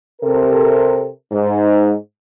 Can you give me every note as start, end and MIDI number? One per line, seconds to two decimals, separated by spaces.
0.21 1.08 48
0.21 1.08 69
0.21 1.08 70
1.31 1.92 44